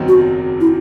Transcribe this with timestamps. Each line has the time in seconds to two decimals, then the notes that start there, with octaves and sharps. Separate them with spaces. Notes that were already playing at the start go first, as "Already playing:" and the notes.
Already playing: F#1 E2 D#3 F#3 C4
0.08 F#4
0.61 E4